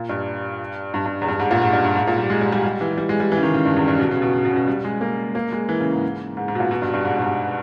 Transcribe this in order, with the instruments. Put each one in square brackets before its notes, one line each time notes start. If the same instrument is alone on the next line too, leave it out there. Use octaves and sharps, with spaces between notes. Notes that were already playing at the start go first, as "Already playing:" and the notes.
Already playing: [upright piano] A#2
G2
G2
G2
E2
G2
G#2
A#2
G#2
G2
G2
G#2
A#2
G3
G#3
G3
G3
G3
E3
G3
G#3
G3
E3
C#3
D#3
C#3
G2
E2
G2
B2
C#3
B2
B2
C#3
B2
G3
G#3
A#3
A#3
G#3
E3
C#3
G#2
G#2
G#2
B2
A#2
B2
G2
G2
G#2
G2
G#2